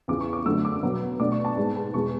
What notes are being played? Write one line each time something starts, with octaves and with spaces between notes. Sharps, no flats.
E2 C#3 E3 D6
C#6
D6
F#2 D3 F#3 A3 E6
D6
B2 F#3 B3
B2 A3 D4 D6
C#6
A5
G#2 G#3 B3
A5
E2 B2 G#3 C#6